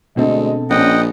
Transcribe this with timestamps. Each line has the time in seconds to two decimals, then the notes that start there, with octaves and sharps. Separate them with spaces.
0.17 D2 B2 D3 G#3 C4 A4 D#5
0.70 A#1 C#4 D#5 F#5 G5